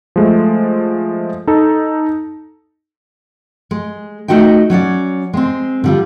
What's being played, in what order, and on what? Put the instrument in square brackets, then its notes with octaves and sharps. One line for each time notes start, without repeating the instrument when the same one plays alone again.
[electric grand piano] F3 G#3 A3
D#4 A4
[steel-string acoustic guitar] G#3
A3 D#4 F#4 D#5 G5
F#3 C#4 C#5 D5
G#3 C4
D3 G3 F4